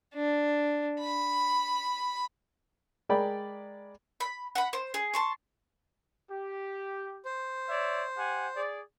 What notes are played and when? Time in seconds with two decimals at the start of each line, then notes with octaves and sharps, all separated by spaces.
0.14 D4
1.00 B5
3.09 G#3 G#4 A#4 D5 G5 B5
4.20 B5
4.55 F#5 B5
4.73 C5
4.94 G#4
5.14 A5 C6 C#6
6.31 G4
7.25 C5
7.69 C#5 D5 E5
8.18 G4 F#5 G#5
8.56 G#4 D5